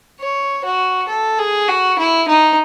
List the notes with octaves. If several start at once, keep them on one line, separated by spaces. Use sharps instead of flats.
C#5
F#4
A4
G#4
F#4
E4
D#4